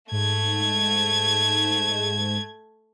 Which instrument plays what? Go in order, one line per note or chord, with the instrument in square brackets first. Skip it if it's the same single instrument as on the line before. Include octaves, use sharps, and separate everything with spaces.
[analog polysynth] G#2 [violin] A3 G#6